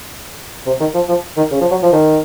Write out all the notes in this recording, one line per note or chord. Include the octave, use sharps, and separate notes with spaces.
C3
D#3
F3
F3
D#3
C#3
F3
F#3
F3
D#3